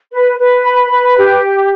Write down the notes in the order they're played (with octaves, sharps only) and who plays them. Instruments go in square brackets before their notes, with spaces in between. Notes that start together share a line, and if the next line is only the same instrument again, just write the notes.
[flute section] B4
B4
B5
B4
G4